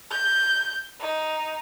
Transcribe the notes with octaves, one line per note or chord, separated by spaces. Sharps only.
G6
D#4